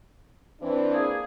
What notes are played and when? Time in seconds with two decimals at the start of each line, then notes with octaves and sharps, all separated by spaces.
0.61 E3 C4 D4
0.94 A#3 G#4